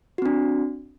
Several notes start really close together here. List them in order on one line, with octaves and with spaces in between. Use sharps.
F#4 C4 D4